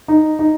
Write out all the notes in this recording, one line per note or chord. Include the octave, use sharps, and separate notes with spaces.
D#4
D#4